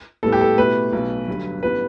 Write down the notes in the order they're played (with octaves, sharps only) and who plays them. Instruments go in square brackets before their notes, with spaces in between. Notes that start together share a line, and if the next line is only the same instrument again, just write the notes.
[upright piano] A2 G3 B3 [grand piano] A4
[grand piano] G4
A4
[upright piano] B2 A3 E4 G4 [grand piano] B4
[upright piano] B1 B2 A3
G1 G2 F#3
[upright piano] A1 E3 G3 B3 [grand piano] B4